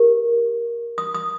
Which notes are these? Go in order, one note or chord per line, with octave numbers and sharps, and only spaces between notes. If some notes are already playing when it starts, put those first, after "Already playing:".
Already playing: G4 A#4
D#6
D#6